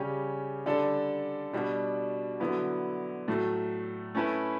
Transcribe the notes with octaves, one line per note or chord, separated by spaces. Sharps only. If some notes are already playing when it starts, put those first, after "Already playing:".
Already playing: C#3 G3 C#4 G4
D3 G3 D4 A4
B2 G3 D4 F#4
D3 F#3 B3 E4
A2 F#3 A3
A3 C#4 E4 B4